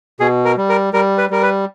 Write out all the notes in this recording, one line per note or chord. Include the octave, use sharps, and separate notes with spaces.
B2 G#4
A#4
G3
A#4
G3 A#4
B4
G3 A#4
B4